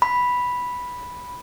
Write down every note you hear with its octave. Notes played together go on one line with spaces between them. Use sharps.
B5